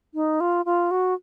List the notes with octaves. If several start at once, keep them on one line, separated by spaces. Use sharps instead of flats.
D#4
F4
F4
F#4